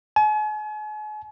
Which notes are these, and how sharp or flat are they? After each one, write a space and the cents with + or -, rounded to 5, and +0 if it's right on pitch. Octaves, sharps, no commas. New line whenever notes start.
G#5 +40